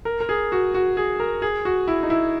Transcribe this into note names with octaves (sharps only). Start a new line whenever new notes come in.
A#4
A#4
G#4
F#4
F#4
G#4
A#4
G#4
F#4
E4
D#4
E4